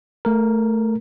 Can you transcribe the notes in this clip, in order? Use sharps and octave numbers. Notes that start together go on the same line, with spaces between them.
A3 A#4